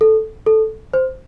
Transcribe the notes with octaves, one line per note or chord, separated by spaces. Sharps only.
A4
A4
C5